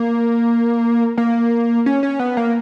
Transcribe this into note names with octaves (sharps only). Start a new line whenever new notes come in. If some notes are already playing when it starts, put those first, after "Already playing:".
Already playing: A#3
A#3
C#4
C#4
B3
A#3